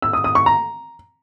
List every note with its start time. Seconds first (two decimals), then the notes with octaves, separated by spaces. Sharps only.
0.02 E6
0.13 D#6
0.24 D#6
0.35 C#6
0.46 A#5